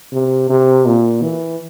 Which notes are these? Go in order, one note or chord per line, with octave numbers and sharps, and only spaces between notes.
C3
C3
A#2
E3